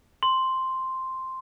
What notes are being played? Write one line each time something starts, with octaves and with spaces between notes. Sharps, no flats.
C6